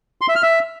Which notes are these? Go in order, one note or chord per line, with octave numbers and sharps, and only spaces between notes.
C6
E5
F6
E5